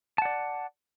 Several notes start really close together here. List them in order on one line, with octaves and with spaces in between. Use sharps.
A5 F#5 D5